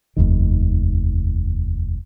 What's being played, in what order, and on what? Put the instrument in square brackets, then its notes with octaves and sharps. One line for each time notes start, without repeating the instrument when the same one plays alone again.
[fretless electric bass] F1 D#2 D#3